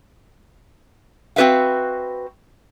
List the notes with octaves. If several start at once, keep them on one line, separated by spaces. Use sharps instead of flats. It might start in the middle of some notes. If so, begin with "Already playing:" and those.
C4 F#4 B4 E5 F5